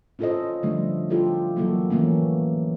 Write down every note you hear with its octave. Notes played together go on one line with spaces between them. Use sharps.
C#4 E4 F4 A4 C5 D#5
D3 F3 G3 A3 D4 E4
E4 F4 G4 A4
E3 F#3 A#3 E4 F#4 A4
E3 A3 A#3 C#4